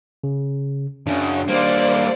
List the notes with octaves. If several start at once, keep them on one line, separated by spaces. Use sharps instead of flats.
C#3
F#2 C#3 D4
G3 A#3 C5 D5